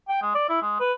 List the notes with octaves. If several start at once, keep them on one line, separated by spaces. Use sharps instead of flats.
G5
G#3
D5
E4
G#3
B4